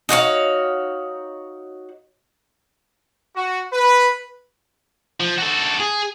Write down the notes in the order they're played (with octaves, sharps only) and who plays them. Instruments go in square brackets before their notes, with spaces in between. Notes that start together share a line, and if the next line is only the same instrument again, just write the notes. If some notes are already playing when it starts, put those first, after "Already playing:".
[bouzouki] D#4 F#4 C#5 F5
[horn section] F#4
B4
[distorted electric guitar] F3
F#4 A4
G#4